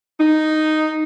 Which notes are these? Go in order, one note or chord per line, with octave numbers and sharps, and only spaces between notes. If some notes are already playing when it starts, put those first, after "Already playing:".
D#4